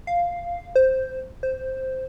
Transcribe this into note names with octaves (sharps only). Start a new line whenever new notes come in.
F5
C5
C5